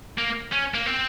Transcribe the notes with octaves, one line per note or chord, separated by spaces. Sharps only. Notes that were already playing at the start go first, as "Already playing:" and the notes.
A#3
C#4
A#3
C4